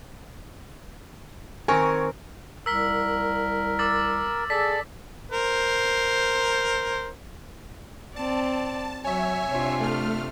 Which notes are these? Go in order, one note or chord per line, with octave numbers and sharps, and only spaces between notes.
D#3 C4 A#4 G#5 C#6
C2 A#4 E6 B6 G7
D6 E6 A6
G#4 A4 D5 B6
A#4 C5
C4 D5 A5
F#3 C#5 E5 G#5
C3 D4 F4
A3 F6